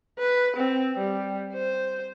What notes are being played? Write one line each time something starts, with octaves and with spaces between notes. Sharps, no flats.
B4
C4
G3
C5